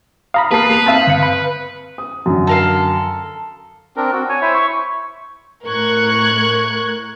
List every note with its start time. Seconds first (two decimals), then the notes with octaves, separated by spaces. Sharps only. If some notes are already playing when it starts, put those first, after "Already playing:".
0.34 F5 A#5 B5 D#6
0.51 A#3 B4 A5 C7
0.70 A#3 F7
0.86 C4 E5 F5 A5 D#7
1.07 G1 C#7
1.23 B5
1.98 D#6
2.26 F#2 D3
2.47 A4 A#4 F5
3.97 C4 D4 A#4
4.12 C4 F#4
4.29 C#5 G#5
4.42 E4 C5 E5
4.54 C#6
5.66 A2 A#4 C#6 F#6 G#6